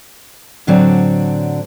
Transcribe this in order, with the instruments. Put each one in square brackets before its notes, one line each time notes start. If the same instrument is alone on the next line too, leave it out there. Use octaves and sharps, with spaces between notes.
[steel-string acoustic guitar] A2 D3 F#3 C4 D4 F#4